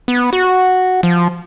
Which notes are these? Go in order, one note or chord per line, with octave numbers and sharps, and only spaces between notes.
B3
F#4
F3